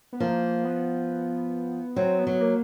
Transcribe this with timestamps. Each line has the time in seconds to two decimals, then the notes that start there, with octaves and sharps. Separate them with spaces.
0.13 B3
0.20 F3 A#3
0.64 B3
1.96 F#3 C4
2.19 B3
2.27 F#3
2.41 A#3